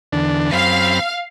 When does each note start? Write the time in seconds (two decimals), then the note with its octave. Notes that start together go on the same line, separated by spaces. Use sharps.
0.12 E2 D3 D4
0.53 F#2 C4 F5 B5